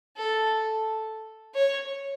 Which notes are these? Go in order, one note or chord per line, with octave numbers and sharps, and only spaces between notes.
A4
C#5